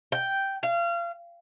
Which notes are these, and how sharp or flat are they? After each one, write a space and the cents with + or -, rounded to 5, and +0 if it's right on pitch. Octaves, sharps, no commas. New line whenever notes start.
G5 -5
F5 -30